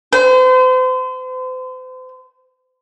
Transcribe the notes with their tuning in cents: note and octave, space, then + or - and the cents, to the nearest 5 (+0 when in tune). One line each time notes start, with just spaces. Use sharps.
C5 -40